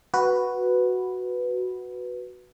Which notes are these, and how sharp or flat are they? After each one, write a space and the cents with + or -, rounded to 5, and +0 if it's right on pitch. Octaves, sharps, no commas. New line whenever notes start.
F#4 +0 B4 +0